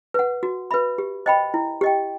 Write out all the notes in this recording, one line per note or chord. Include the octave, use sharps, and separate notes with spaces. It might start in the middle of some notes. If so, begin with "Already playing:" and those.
B4 F#5
F#4
B4 E5 B5
G4
C5 D#5 G5 B5
E4
G4 D#5 G5